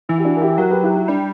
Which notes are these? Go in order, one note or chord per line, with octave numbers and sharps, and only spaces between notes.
E3 E4
G4
D4 F#4
A#4
E4 G4
F#3 F#4 A#4
G4 B4
E4 G4
E4
G3 D4